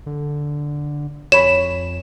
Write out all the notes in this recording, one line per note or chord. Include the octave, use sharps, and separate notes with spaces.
D3
F2 C#5 B5 E7